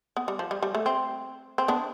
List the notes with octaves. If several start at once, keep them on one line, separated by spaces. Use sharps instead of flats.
B3
G3
F3
G3
G3
A3
C4
C4
B3 D4